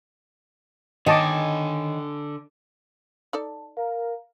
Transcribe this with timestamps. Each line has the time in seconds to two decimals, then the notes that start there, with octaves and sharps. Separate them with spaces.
1.06 D3 D#3 C#5 D#5 G#5 A5 D6
3.33 D#4 A4 D5 A5
3.77 A#4 F5